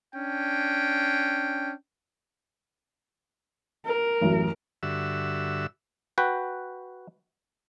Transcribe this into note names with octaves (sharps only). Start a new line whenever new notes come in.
C#4 D4 G5
A#4
A1 F#2
G2 D3 F#4 E5 E6
F#4 B4 G5